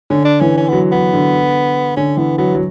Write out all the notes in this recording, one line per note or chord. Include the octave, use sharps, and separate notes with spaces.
D3 C#4
D4
E3 C#4
C#4
F#3 B3
F#3 B3
D3
D3 C#4
E3 B3
F#3 B3
F#3